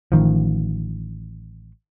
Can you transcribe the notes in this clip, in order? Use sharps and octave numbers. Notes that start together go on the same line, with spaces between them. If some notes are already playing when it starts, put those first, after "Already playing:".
A1 D#3 F3